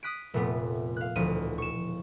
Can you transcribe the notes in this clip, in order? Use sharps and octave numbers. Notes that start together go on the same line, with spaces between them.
D#6 F#6 B6 D7
F1 A#2 A3 B3
F5 F#6
E1 D2 F3 D#7
C#6 E7